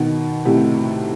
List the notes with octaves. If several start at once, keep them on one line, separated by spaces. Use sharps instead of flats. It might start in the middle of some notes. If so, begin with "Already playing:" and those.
Already playing: B2 D#3
A2 C3